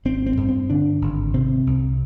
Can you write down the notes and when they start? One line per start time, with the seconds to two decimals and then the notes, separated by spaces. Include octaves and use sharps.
0.05 G#1 C4
0.26 C4
0.37 G2
0.49 C4
0.70 D3 D4
1.02 G#1
1.34 C3 C4
1.67 C2